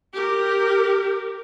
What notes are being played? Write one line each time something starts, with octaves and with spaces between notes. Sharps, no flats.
G4 A#4